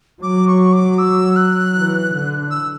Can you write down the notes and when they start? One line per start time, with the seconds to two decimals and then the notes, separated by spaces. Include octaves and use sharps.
0.23 F#3 D6
0.48 C#6
0.73 D6
0.99 E6
1.36 F#6
1.75 E3
2.13 D3
2.51 E6